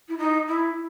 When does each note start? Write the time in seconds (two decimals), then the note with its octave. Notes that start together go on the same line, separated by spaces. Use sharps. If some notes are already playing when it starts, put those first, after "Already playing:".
0.08 E4
0.17 D#4
0.47 E4